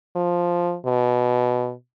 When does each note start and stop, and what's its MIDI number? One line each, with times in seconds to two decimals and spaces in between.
0.16 0.76 53
0.86 1.72 47